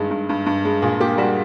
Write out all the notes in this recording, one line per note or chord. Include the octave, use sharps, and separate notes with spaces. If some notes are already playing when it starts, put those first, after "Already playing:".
Already playing: G2 D#3 G#3
G2
G2
G2
G#3
A#2 G#4
A#3 G4
G3 F#4